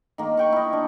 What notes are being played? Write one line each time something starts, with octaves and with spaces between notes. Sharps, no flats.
D#3 A#3
F#5 G5 C#6
E4 D#5
D4